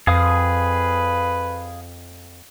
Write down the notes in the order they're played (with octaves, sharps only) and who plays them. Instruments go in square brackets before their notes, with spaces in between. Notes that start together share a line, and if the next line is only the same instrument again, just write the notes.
[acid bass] F2 [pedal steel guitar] G#4 F5 D#6 [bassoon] B4